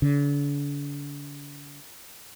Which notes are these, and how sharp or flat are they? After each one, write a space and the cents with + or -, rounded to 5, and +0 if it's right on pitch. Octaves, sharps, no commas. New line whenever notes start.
D3 -40